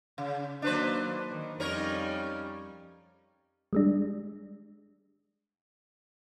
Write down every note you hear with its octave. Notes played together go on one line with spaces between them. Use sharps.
C#3
D#3 F#3 A#3 D4 B4 C5
D#3
F2 G3 C#4 D#4 A#4 C#5
G3 G#3 D4